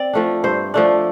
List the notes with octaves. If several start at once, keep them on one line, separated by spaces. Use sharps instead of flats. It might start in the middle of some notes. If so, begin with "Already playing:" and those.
Already playing: C4 D5
F3 A3 D4
G2 C5
F3 A3 D4